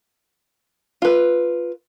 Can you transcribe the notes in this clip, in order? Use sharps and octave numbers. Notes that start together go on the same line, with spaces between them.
F4 B4